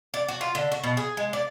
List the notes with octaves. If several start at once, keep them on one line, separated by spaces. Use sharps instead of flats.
D5
F#4
F4
D3
F#4
B2
G#4
G#3
D5